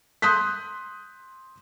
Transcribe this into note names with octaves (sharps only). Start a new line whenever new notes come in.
C6 D#6 F#6 G6 B6